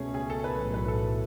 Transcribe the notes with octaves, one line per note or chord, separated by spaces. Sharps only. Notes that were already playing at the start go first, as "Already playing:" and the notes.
Already playing: C#2 B2 A3 C#4 G#4
G#4
A4
B4
B1 A2 E3
B4
A4